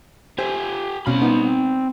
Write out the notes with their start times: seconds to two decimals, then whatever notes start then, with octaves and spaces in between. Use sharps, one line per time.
0.38 G4 C5 E5 G#5
1.06 B2 C4 C#4 F5 B5
1.22 B3 D#4